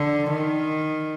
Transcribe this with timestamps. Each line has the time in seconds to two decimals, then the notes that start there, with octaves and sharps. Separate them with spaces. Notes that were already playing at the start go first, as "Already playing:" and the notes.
Already playing: D3
0.30 D#3